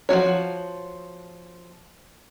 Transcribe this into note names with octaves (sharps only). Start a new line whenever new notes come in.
F3 A3 F#4 C#5